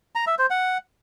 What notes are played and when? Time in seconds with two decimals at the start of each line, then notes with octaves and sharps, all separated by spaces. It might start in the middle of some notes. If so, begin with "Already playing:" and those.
0.15 A#5
0.27 E5
0.39 C5
0.50 F#5